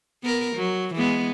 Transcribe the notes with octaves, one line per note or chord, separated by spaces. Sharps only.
B3 A#4
F#3
E3 G#3 B3